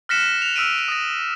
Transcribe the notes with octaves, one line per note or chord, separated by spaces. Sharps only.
F6 F#6 A#6 B6 C#7 E7
F#6 F7
E6 F6 B6 D7 D#7
D#6 A#6